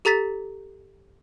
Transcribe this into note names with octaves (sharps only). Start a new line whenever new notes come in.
G4 A4 A#5 A6 B6